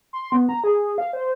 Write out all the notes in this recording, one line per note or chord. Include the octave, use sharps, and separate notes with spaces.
C6
B3
A#5
G#4
F5
C5